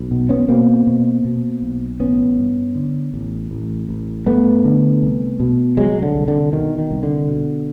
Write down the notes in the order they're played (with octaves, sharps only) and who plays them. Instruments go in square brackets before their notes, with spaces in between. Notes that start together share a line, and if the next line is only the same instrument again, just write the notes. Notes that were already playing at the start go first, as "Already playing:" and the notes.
Already playing: [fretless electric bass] B1
B2
B3 C#4
B2 A#3 C4
B2
B2
B1
A1 B3 C#4
G2
D3
A1
A1
A1
G2 A3 B3
D3
C2
B2
C2 F#3 G#3
D3
C2
D3
B2 D#3
D#3
C2
D3
B2